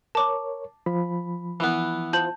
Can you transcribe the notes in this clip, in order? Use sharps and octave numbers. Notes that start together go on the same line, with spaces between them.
A#4 C#5 A5 D6
F3 B5
E3 B3
F4 C5 A5 G6 F#7